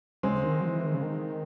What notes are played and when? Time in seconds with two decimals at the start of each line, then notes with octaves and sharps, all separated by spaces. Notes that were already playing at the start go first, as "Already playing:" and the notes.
0.23 C#3 G#3 C4
0.44 D#3
0.61 F#3
0.65 E3
0.86 D#3
0.94 C#3
1.03 D#3